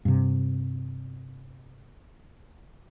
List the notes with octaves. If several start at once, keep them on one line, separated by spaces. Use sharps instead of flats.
G2 C3